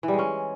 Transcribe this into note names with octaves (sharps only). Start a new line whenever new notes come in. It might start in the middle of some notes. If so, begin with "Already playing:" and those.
E3
G3
G#3
C#4